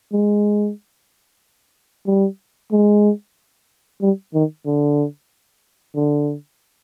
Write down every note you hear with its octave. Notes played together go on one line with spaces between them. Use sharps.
G#3
G3
G#3
G3
D#3
D3
D3